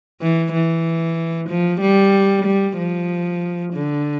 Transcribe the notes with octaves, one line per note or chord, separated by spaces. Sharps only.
E3
E3
F3
G3
G3
F3
D3